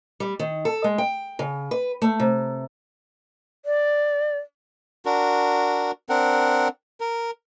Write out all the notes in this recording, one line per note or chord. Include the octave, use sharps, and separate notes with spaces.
G3
D#3
A4
G#3
G5
C#3
B4
A3
C3
D5
D4 F#4 A#4
C4 D4 A#4 F#5
A#4